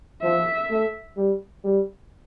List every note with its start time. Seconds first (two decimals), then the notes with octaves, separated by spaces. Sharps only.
0.23 F3 E5
0.70 A3
1.17 G3
1.64 G3